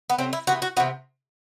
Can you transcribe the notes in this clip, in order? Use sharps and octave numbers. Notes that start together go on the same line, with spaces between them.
B3
C3 F#3 A3 C4
E4
C3 E3 B3 F#4
F#4
C3 E3 B3 F#4